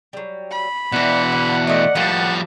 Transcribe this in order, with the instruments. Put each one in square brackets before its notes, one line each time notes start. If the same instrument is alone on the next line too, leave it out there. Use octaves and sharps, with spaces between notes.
[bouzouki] F#3 G3
[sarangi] B5
[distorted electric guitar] B2 E3 [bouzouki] F#4 D5 [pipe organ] F#5
[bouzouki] D3
[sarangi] A3 [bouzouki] D5 D#5
[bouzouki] A2 D#3 A#3 [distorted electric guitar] F3 G3 [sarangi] A5